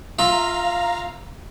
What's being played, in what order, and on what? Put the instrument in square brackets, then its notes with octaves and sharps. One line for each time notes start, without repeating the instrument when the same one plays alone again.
[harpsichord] F4 E5 [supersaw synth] F5 A#5